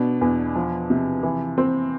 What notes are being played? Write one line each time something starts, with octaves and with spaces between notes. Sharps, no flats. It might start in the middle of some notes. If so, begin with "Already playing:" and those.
Already playing: B2 D4
E2
F3
C3
E3
C4